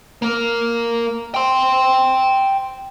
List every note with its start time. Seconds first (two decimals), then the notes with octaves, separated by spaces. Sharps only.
0.22 A#3 A#4
1.34 G5 C6